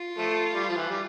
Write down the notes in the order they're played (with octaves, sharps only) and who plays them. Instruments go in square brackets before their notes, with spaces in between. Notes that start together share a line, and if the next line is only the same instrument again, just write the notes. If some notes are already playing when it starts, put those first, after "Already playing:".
Already playing: [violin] F4
[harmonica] F3 A3
G3
F3
E3
G3